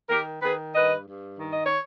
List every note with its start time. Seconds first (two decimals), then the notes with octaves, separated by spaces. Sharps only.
0.09 D#3 G4 A#4
0.42 D#3 G#4 B4
0.74 G2 B4 D#5
1.06 G2
1.38 D#3
1.52 D#5
1.65 C#5